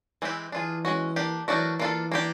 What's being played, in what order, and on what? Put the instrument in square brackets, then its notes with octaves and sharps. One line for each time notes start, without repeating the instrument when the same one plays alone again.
[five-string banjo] E3 G#3 C4 E4 G4
[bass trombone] E3 [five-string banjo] D4 F4 G#4
[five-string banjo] G#3 C#4 F#4
A#3 D4 G4
[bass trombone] E3 [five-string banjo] F#3 A3 D4 F#4 A#4
[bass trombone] E3 [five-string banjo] A#3 D4 F4 A4
[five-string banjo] A#3 D4 G4